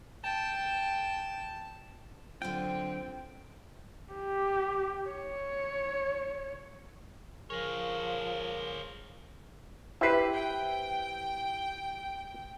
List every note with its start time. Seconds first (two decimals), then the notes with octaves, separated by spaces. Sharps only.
0.24 G5 A5
2.42 D3 F#3 C4 F4 G5
4.13 G4
5.10 C#5
7.50 F3 F4 G#4 A#4 C#5
10.01 E4 G4 B4 C5 E5
10.33 G5